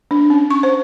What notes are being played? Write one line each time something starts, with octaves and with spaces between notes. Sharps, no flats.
D4
C#4
C#6
C5